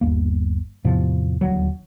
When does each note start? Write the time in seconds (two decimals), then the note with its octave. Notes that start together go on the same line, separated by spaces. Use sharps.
0.01 G1 D#2 A#3
0.84 E2 A2 C3 F3
1.41 D#1 D2 F#3